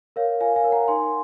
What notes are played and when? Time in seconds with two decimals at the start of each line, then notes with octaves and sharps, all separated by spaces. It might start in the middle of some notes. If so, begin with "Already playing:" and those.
0.16 A#4 C#5 F5
0.41 F4 F5 G#5
0.56 F5 G#5
0.64 A#4 C#5
0.72 F#5 A#5
0.88 D#4 G#5 C6